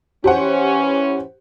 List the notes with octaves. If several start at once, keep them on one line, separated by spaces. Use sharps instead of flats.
E3 C#4 G4 C5 F#5